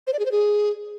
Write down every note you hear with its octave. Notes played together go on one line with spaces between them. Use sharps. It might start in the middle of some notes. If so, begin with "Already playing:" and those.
C5
D5
G#4
C5
G#4